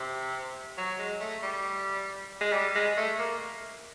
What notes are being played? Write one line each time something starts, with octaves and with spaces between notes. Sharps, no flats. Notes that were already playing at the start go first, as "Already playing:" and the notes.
Already playing: C3
F#3
G#3
A3
G3
G#3
G3
G#3
A3
A#3